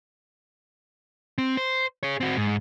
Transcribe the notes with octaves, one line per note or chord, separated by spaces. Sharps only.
C4
C5
G#4 C#5
C4 F#4
G#2